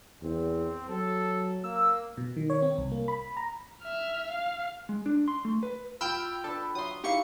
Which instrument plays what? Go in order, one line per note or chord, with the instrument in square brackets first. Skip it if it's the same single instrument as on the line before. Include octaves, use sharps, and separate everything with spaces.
[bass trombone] E2 [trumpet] C4
[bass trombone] F#3 [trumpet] A4
[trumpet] A#3 [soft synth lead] E6
[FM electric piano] B2
D#3
C#5
C4
C2
A#3
B5
A#5
[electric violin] E5 F6
F5
[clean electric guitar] G#3
D4
C6
A3
B4
[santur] F4 [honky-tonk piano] G5 B5 [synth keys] E6 F6 G6
[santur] D4 B4 [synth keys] A4
[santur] F#3 E5 [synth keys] C6 D#6
[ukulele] D#4 E4 F5 [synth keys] G4 C#6 C#7